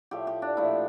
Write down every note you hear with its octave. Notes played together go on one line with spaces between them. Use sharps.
A2 F3 A3 G4
G4
D4
A#2 F3 A3 E4